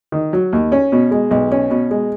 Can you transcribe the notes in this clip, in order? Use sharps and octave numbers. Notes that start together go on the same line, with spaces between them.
D#3
F#3
D#2
C#4
B2
G#3
B1
C#4
B2
G#3